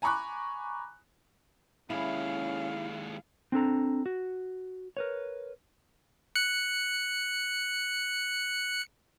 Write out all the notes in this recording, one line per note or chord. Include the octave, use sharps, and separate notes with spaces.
G#5 A#5 B5 C#6 D6 F#6
D#2 G#3 C#4 E4 F5
C4 D4 A4 A#5
F#4
A#4 B4 C#5
F#6 C#7